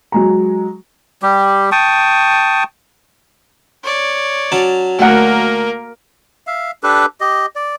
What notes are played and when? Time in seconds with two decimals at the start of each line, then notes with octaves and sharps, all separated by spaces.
0.12 F#3 G#3 A#5
1.22 G3 G4
1.72 G5 A5 C#6 D#6
3.84 C#5 D5
4.52 F#3 C#4 A5
4.99 D2 A#3 A#4 F#5
6.47 E5 F5
6.83 D4 G4 A4 B4
7.21 G4 D#5
7.56 D5